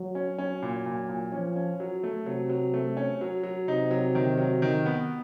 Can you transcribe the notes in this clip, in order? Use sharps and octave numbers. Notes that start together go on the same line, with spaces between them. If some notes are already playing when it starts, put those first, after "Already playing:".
Already playing: F#3
C#4
F#3 C#4
A#2
A#2
A#2
F3 C#4
C#4
F#3
A3
C3 F#3
F#3
A3
C#4
F#3
F#3
C3 D#4
F#3
D#3
F#3
D#3
B3